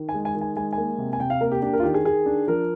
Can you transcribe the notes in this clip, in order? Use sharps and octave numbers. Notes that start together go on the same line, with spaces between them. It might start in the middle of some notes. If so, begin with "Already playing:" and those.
Already playing: D#3
G#5
G#3
G#5
D#3
G#5
G#3 G#5
G#5
A#3
C3
G#5
C3 G5
F5
A#3 A#4
G4
D4 G4
A#4
F4
D#3 G4
G#4
D#3 G#4
D4
F3 A#4